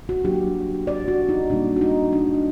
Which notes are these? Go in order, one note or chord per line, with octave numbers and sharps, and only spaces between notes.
F#4
F#3 A#3 D4 G4
D5
F#4
D#4
A#2 G3 A#3 D4
F#4
D#4
D4